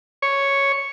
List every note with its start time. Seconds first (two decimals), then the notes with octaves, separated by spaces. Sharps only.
0.22 C#5